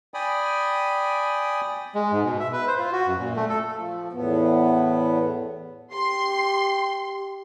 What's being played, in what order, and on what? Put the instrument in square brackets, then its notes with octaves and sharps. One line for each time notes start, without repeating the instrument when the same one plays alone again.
[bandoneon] D5 G5 G#5 B5 D#6
G#3
G#2
B2
E5
B4
C5
F4
F#4
F#2
A#2
A3
A4
[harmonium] F3
E2 A2 B3
[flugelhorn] G4 [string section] C6